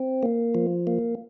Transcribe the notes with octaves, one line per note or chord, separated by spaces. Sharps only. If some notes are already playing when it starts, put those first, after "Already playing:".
Already playing: C4
A#3
F3
A#3